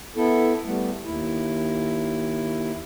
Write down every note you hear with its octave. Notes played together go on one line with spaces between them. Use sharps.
B3 E4 A4
G3 A3 B3
D#2 E4